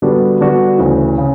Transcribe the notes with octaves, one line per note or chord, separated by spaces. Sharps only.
D3 G3 B3 D4 F#4
D3 G3 B3 D4 F#4
D2 C#3 E3
C#3